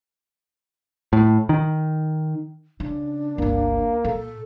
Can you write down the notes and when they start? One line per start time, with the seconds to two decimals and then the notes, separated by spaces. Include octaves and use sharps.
1.13 A2
1.49 D#3
2.80 C#3 D4
3.38 G1 C#2 A#3
4.05 A#2 A4